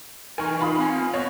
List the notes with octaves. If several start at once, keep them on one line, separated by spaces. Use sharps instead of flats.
E3 D#4 A#4 G#5 C#6
F4 B5 D#6
C4 G#5
B3 C#5 D#5